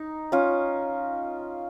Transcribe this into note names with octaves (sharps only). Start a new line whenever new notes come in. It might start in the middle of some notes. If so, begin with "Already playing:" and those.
Already playing: D#4
C#4 F4